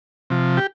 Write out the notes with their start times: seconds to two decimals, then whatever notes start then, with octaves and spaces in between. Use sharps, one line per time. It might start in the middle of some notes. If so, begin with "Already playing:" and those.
0.30 C3 F3
0.57 G4